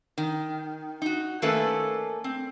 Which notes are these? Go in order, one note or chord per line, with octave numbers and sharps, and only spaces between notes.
D#3
D#4 F#4
D#3 A3 A#3 C#4 A4 B4
C4